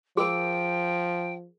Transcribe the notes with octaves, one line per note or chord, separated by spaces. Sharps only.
F3 G#4 A#4 G5